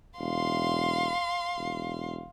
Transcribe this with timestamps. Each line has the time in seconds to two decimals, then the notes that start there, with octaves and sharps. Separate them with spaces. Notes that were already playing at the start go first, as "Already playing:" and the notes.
0.20 E1 F5 C6
1.58 E1